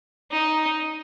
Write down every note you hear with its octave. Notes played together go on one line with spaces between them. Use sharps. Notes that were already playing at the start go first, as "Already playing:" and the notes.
D#4